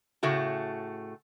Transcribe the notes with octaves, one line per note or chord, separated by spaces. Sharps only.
A2 C#3 A3 F#4